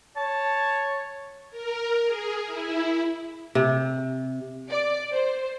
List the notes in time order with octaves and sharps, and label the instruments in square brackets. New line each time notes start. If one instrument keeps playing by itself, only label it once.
[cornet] C#5 [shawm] A5
[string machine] A#4
G#4
E4
[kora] C3
[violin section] D5
C5